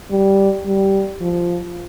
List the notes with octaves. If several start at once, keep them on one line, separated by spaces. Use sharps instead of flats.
G3
G3
F3